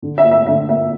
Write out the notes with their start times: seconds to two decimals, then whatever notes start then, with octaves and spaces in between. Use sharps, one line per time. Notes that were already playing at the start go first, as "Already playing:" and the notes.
0.02 D3
0.18 E5
0.24 A#3
0.31 E5
0.46 D3 E5
0.68 A#3 E5